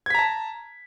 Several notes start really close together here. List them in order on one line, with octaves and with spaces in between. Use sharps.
G#6 B6 A#5 A5